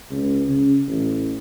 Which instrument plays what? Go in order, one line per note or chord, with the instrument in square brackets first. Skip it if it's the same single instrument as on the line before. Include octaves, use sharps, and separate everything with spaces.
[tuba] C#2
C#3
A1